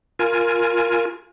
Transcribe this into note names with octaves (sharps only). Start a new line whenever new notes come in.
F4 A#4 G#5